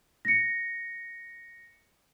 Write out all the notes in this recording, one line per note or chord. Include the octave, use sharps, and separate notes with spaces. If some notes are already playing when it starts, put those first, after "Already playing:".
A#6 C#7